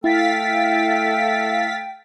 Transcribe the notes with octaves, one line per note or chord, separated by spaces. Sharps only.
A3 E4 A4 F5 G5 A6 B6